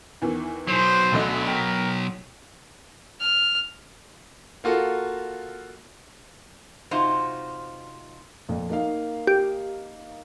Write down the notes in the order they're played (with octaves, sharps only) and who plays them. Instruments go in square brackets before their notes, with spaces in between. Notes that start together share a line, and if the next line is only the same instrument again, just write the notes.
[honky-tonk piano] E2 D#3 E3
[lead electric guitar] B2 F#3 [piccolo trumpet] C5
[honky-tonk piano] D2 D3 D#5
[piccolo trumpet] A#4 [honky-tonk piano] G5 B6
[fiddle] F6
[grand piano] A#3 F4 F#4 A4
[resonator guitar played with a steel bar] C3 D#4 F4 F#4 C5
[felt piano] F2 A#2
A#3 D#4 F5
[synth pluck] G4